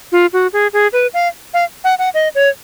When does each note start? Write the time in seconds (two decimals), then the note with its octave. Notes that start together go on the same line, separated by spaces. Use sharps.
0.12 F4
0.33 F#4
0.53 G#4
0.73 G#4
0.93 B4
1.14 F5
1.54 F5
1.84 F#5
1.99 F#5
2.14 D#5
2.35 C#5